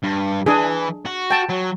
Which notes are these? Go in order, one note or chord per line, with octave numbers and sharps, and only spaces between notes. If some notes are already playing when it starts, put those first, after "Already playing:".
G2
E3 D4 G#4
F#4
G5 A5
F#3